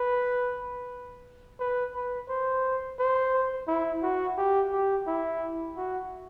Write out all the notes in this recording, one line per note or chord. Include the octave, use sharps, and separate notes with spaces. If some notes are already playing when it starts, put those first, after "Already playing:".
Already playing: B4
B4
B4
C5
C5
E4
F#4
G4
G4
E4
F#4